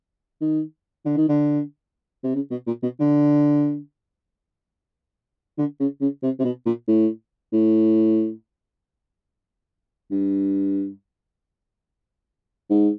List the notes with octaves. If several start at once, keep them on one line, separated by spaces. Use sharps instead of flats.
D#3
D3
D#3
D3
C3
C#3
B2
A#2
B2
D3
D3
C#3
C#3
C3
C3
B2
A#2
A2
A2
G2
G#2